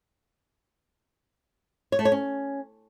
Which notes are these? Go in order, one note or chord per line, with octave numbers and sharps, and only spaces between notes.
C#5
A3
C#5
C#4